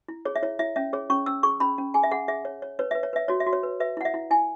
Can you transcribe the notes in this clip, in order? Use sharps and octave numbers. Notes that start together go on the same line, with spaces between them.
E4
G#4 C#5
E5
E4 C#5
E4 E5
C#4 E5
G#4 C#5
C#4 C#6
C#4 E6
G#4 C#6
C#4 B5
C#4
G#4 G#5
E5
G#4 F#5
G#4 E5
C#5
C#5
B4 C#5
B4 E5
C#5
B4 E5
F#4 C#5
E5
F#4
C#5
B4
B4 E5
E4 F#5
E5
E4
E4 G#5